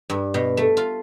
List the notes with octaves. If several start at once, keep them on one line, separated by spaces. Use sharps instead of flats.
G2
B2
A3
F4